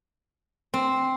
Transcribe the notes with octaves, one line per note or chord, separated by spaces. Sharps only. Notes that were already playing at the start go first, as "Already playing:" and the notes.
C4